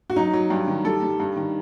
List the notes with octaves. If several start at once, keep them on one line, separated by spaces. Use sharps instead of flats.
F#4
F#3 D#4
F#3
G2 G4
D#3
G3 A4
G3
G2
D#3